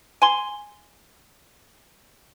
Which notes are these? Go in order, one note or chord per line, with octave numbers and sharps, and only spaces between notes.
G#5 C6